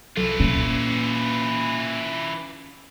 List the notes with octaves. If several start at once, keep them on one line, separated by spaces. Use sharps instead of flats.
C2 E3 F#3 F4 A4
A#2 C#4